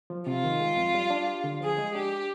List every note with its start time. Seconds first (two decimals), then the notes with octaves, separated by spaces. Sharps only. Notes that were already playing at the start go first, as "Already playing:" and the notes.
0.10 F3
0.27 C3 F4
0.44 D#3
0.60 G#3
0.76 F2
0.94 G3
1.10 D4
1.27 G4
1.44 D3
1.61 F3 G#4
1.78 G#3
1.94 D4 G4